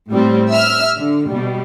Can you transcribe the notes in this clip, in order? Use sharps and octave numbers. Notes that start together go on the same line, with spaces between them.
A2 G3 C4
E5 E6 F6
D3
B2 G3